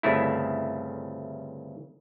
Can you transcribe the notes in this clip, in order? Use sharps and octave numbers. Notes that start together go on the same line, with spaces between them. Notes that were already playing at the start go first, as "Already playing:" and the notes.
G1 C2 C#3 A3 E4